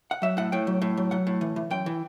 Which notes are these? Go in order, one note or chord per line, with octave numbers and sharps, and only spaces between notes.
F#5
F#3 E5
A2 F#5
A2 G5
F#3
A2
F#3
F#3 F#5
A2
E3
E3
F#2 G5
E3